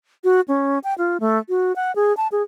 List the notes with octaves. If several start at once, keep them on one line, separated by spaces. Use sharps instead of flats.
F#4
C#4
G5
F4
A3
F#4
F#5
G#4
A5
G#4